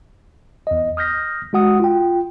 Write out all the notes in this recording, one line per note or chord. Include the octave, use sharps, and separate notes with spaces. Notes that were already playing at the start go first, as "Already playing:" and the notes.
E2 D#5
D#6 F6 G6 A#6 B6
G#3 F#4 F#5 D#6
F4 G5